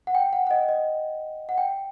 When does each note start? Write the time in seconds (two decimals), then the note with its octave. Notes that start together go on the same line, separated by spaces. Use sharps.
0.07 F#5
0.15 G5
0.33 F#5
0.47 F#5
0.51 D#5
0.69 D#5
1.49 F#5
1.58 G5